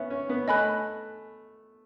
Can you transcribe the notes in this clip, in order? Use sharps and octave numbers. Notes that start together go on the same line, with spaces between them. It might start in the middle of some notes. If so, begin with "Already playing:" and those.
Already playing: B3 C#4 E5
C#4
B3
A3 D#5 G#5 B5 F#6